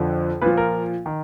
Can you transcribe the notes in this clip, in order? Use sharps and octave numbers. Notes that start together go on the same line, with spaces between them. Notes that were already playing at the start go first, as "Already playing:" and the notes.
Already playing: F2 D3 F3
A#2 F3 B4
A#4
D#3